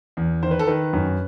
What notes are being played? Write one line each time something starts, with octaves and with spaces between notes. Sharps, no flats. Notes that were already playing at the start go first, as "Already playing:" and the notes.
E2
D#3 C5
B4
A4
D#3 B4
F#2